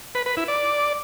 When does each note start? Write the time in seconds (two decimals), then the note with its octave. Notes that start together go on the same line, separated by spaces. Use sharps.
0.15 B4
0.26 B4
0.37 E4
0.48 D5